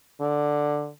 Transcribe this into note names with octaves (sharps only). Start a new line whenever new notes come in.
D3